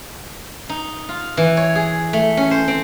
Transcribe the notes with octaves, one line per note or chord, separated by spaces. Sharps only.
D#4
F4
E3
C#5
G#4
A3
C#4
C5
C4